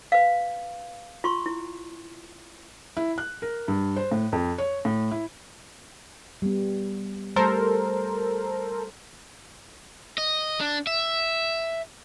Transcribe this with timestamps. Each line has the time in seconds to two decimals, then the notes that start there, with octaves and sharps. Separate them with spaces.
0.12 B4 F5
1.24 F4 C6 C#6
1.46 E4
2.97 E4
3.18 F#6
3.42 A#4
3.68 G2
3.96 C5
4.12 A2
4.32 F2
4.58 C#5
4.85 A2
5.11 E4
6.42 G3 B3
7.36 G3 A3 A4 A#4 C5
10.18 D#5
10.60 D4
10.87 E5